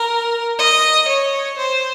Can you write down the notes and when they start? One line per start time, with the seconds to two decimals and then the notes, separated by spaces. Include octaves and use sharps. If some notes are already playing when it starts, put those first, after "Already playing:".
Already playing: A#4
0.59 D#5
1.08 C#5
1.58 C5